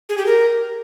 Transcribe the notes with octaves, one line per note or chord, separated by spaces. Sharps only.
G#4
G4
A#4